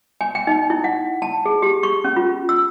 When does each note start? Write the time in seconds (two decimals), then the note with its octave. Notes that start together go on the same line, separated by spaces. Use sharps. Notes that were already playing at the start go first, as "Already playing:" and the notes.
0.21 G#5
0.35 G5
0.47 D#4
0.70 E4
0.84 F#5
1.22 A5
1.46 G#4
1.62 G4
1.83 C#6
2.04 C#4
2.16 F4
2.49 E6